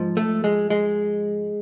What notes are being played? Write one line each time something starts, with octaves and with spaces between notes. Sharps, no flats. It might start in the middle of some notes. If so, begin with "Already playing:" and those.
Already playing: G#2 F3
A3
G#3
G#3